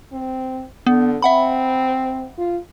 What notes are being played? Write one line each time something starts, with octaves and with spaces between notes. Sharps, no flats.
C4
D3 B3
C4 E5 F#5 B5
F4